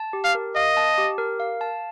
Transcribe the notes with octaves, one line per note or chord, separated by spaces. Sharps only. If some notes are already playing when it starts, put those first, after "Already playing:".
Already playing: A5
G4
F5
A#4
D#5 F5
A5
G4
A#4
F5
A5